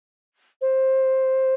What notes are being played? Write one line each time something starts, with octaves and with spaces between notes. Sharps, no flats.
C5